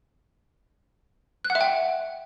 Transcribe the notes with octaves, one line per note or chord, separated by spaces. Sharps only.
F#6
F#5
E5
G5